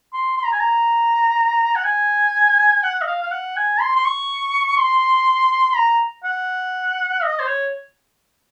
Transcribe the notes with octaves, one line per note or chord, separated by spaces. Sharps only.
C6
C6
A#5
G#5
A#5
F#5
G#5
F#5
D#5
F5
F5
F#5
G#5
C6
C6
C#6
C6
A#5
F#5
D#5
C5
C#5